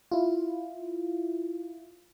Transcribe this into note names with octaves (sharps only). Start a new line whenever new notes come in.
E4 F4